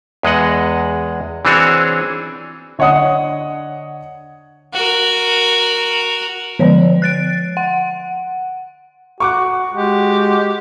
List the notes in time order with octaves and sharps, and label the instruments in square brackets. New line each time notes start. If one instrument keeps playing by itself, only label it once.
[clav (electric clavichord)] E2 G#3 D#5 F#5
E3 C4 D4 F#4 G#4 C#5
[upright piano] D3 C#5 D#5 F#5 D#6
[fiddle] F#4 A#4
[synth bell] D3 F3 C#5
F#6 A6 D7
F#5
[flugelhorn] F#4 [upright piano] C#6 D6 F#6
[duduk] G#3 [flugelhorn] F#4 [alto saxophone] G4